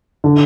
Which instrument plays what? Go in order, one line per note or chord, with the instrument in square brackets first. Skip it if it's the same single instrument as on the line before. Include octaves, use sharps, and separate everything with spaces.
[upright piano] D3